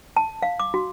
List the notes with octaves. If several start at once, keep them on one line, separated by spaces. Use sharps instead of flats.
A5
F5
D6
F#4